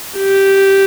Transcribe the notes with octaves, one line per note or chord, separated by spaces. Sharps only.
G4